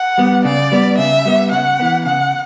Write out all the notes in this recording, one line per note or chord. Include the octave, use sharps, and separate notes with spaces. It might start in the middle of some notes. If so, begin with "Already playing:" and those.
Already playing: F#5
G3 B3
C#3 D5
G3 B3
C#3 E5
G3 B3
C#3 F#5
E3 B3
C#3 F#5